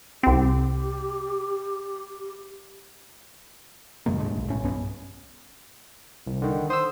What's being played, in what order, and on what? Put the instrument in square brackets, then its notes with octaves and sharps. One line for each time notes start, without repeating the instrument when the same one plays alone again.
[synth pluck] C2 C4 [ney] G4
[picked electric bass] F#2 C#3 G#3 A#3
D#2 A2 G#3 D4
B1
A2 C#4
B1 G2 B3 C#4
[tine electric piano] C2
D3 D#3
[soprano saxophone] C5 [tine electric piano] D#6 E6